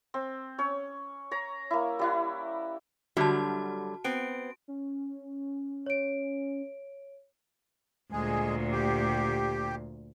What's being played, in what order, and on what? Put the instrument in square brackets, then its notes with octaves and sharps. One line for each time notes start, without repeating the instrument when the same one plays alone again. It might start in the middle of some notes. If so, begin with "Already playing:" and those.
[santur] C4
C#4 C#5
C#5 A#5
A#3 E4
G3 E4 F#5
[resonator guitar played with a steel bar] D3 F#3 G3 [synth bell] F#4 A5
[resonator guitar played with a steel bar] B3 C4 [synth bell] D7
[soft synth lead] C#4
[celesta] C#5 D7
[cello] D2 A#2 [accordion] G#3 G#4
[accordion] G4